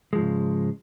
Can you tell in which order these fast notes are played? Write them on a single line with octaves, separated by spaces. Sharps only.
G#3 F3 G#2 C#3